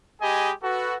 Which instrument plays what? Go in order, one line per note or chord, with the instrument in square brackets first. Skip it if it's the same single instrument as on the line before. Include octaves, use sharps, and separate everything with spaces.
[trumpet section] G#3 G4 G#4 D#5 G#5 B5
F#4 A4 B4